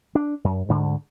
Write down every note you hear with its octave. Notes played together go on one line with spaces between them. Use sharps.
D4
F#2
D2 G#2 D3